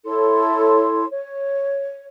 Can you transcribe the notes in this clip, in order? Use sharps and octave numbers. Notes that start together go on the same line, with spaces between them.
E4 A4 C#5 C6
C#5